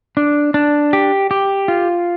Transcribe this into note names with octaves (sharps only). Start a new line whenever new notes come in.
D4
D4
G4
G4
F4